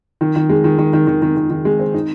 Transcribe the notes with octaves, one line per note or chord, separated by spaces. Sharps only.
D#3
D#3
G#3
D#3
D#3
D#3
D#3
D#3
D#3
D#3
G#3
C4
D#4